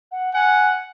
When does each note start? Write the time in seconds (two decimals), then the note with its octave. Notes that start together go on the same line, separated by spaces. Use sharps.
0.12 F#5
0.34 F#5 G#5